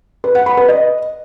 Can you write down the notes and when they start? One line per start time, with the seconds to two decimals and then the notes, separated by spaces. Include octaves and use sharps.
0.24 B4
0.35 F#5
0.46 B5
0.57 B4
0.69 D#5